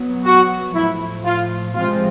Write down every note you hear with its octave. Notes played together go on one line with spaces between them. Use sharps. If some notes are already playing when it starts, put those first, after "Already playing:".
Already playing: B2 F#3 B3
F#4
A2 F3 A3 E4
F4
C3 F3 G#3 C4 F4